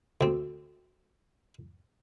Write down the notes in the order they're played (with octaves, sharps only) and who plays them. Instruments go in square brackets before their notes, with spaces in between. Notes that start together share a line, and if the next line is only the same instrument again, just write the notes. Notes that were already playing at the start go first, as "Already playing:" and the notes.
[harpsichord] D2 C4